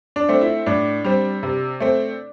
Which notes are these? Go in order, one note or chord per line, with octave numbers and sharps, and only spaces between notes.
D4
A3 C4
E4
A2 D4
G3 C4
C3
A3 C4